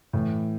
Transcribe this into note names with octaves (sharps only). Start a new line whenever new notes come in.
A2 E3